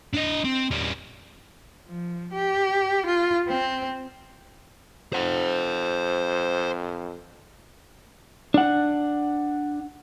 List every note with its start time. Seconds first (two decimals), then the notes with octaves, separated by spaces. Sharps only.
0.14 D4 D#5
0.45 C4
0.71 G3 C#4
1.88 F3
2.33 G4
3.06 F4
3.48 C4
5.13 F2 C5 F#5
8.54 D4 F#5